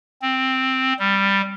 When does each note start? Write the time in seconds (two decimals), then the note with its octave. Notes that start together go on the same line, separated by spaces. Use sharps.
0.22 C4
0.99 G3